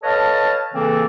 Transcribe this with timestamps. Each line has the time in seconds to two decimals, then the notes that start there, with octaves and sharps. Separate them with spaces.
0.03 A4 B4 C#5 D#5 F5 A5
0.74 C#3 E3 A#3 C4 A4